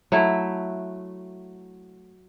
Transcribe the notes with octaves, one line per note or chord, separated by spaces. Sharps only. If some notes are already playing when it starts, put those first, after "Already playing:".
F#3 A3 E4